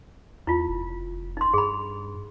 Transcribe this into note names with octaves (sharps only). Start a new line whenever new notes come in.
E2 E4 F4
F1
D#4 C6
G2 G#4 B5